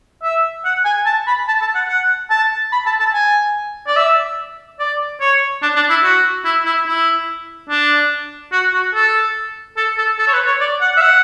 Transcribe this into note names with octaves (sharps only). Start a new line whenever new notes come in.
E5
F#5
G#5
A5
B5
A5
A5
F#5
F#5
A5
B5
A5
A5
G#5
D5
E5
D5
C#5
D4
D4
E4
F#4
E4
E4
E4
D4
F#4
F#4
A4
A4
A4
A4
C#5
B4
C#5
D5
F#5
E5
F#5